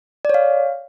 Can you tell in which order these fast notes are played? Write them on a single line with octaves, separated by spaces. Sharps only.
D5 C#5 F5